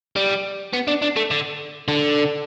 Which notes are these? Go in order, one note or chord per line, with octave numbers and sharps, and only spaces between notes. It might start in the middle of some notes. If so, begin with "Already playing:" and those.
G3
B3
D4
D4
A3
D3
D3